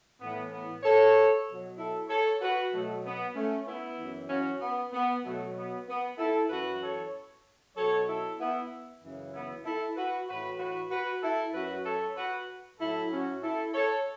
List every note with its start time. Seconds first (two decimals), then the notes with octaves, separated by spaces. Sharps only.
0.20 A2 E3 B3
0.51 B3
0.83 A4 C#5
1.47 B2 F#3
1.77 E4 A4
2.09 A4 C#5
2.41 F#4 B4
2.72 B2 F#3 A3
3.04 B3
3.35 A3 C#4
3.66 B3 E4
3.98 F#2 E3
4.29 C#4 F#4
4.61 B3
4.92 B3
5.24 B2 F#3 A3
5.56 B3
5.87 B3
6.18 E4 A4
6.49 F#2 E3 F#4 B4
6.81 A4 C#5
7.76 B2 F#3 A4 C#5
8.07 E4 A4
8.39 B3 E4
9.02 F#2 C#3 E3
9.33 B3 E4
9.64 E4 A4
9.95 F#4 B4
10.28 A2 E3 F#4 B4
10.58 F#4 B4
10.90 F#4 B4
11.22 E4 A4
11.53 F#2 F#3 F#4 B4
11.85 A4 C#5
12.16 F#4 B4
12.79 A2 F#3 E4 A4
13.11 C#4 F#4
13.43 E4 A4
13.73 A4 C#5